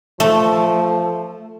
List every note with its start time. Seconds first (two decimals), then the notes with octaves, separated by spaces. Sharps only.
0.20 F3 A3